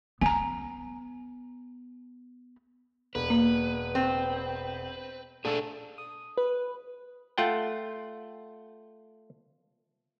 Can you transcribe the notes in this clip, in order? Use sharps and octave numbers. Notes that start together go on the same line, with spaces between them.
B3 G#5 A#5
E1 B4
A#3
C4
A3 D4 G#4 A4
D#6
B4
A3 F4 F#5 G5